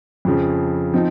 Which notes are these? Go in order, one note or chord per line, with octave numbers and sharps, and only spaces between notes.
F2 C#3 F3
F3 C4 D#4